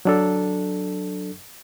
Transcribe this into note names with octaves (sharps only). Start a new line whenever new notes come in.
F#3 D4 A4